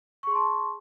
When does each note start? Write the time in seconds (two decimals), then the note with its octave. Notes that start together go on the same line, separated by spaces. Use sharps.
0.23 C#6
0.27 G#4
0.31 C6
0.35 A5